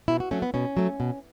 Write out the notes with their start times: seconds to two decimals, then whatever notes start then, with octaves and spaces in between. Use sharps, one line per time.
0.08 B2 E4
0.20 F#4
0.31 F#3 A3 C#4
0.42 B3
0.54 B2 C#4
0.77 F#3 A3
1.00 B2